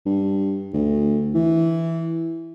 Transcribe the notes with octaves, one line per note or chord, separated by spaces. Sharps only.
G2
D2
E3